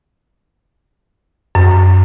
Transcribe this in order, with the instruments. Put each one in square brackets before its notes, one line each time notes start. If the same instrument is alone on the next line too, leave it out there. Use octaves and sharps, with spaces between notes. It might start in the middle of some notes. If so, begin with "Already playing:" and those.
[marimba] F#2